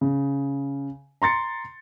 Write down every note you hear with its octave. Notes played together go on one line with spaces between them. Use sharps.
C#3
A#5 C6 A6 C#7